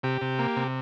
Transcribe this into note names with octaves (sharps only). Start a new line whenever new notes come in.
C3 G4
C3
A#3
C3